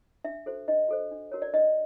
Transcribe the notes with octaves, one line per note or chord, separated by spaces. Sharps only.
D4 E5
F#4 A4 C5
D4 D#5
F#4 A4 C5
D4
F#4 A#4 C#5
D5
D4 D#5